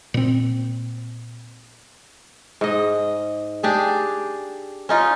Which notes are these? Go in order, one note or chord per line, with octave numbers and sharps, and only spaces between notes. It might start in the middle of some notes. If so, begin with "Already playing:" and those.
A#2 C4
G#2 D#5
D4 G4 G#4
C#4 D#4 F4